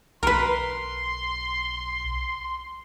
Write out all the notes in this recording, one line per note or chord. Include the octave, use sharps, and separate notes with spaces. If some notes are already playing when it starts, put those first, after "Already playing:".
B1 A#4 B4 C6